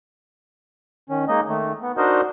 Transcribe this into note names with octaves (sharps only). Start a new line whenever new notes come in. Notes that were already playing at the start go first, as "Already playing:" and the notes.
D#3 C#4
G#3 A#3 D#4 D#5
D#3 A3
B3
D4 D#4 F#4 A#4 C5 D#5